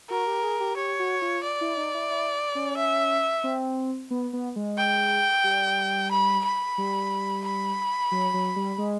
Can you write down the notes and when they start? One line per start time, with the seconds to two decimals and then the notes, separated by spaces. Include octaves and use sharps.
0.10 F#4 A#4
0.27 G4
0.43 G#4
0.60 G4
0.77 G4 C#5
0.99 F#4
1.22 F4
1.44 D5
1.61 E4
1.77 D#4
1.94 E4
2.11 E4
2.55 C#4
2.78 E5
3.44 C4
4.11 B3
4.33 B3
4.56 G#3
4.78 G5
5.44 G3
6.11 B5
6.45 B5
6.78 G3
7.45 B5
8.12 F#3
8.34 F#3
8.56 G3
8.78 G#3